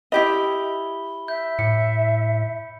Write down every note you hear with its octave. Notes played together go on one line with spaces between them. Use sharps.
E4 G4 D#5 B5 G7
E5 G6
A2 C#7